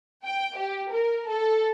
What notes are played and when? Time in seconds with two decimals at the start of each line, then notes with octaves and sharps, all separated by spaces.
0.25 G5
0.56 G4
0.92 A#4
1.28 A4